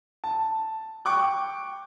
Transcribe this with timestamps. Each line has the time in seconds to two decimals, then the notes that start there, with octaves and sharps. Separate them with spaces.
0.24 A5
1.05 G5 C#6 D6 F#6